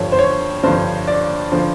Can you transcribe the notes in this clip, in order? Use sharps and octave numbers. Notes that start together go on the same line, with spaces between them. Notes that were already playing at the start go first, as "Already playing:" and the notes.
Already playing: G2 D3 F3 C#5
C5
C#5
G2 D3 F3 C5
D5
D3 F3 C5